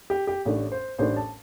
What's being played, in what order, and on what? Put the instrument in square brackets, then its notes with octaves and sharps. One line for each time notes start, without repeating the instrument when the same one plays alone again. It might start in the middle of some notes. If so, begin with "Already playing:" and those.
[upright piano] G4
G4
A1 A2 A3 D4
C5
A1 A2 A3 D4 C5
A5